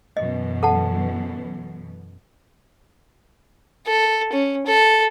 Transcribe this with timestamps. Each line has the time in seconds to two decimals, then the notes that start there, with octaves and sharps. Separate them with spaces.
0.17 F#2 B2 E3 D#5
0.63 A4 F#5 A5
3.87 A4
4.32 C#4
4.66 A4